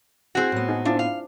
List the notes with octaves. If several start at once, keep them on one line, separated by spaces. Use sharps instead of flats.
C4 E4 F#4 G#4
A2 B3
D#4 G#4
C4 D4 E4 F4
F5